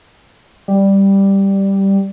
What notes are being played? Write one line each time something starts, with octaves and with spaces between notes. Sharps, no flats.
G3